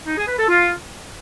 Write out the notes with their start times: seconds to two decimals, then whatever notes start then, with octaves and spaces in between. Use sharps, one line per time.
0.07 D#4
0.17 G#4
0.28 B4
0.38 A4
0.49 F4